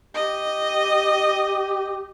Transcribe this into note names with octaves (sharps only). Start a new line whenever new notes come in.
G4 D#5